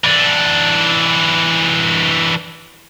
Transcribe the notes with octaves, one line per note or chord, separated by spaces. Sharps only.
E3 D4